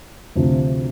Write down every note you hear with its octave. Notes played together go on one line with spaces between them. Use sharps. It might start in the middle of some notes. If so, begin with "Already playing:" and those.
D2 C3 F3